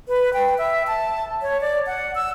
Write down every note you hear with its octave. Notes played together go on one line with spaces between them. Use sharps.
B4
G5
E5
A5
C#5
D5
F#5
E6